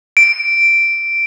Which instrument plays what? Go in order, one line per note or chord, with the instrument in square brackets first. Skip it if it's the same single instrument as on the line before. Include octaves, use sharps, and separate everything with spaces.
[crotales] D7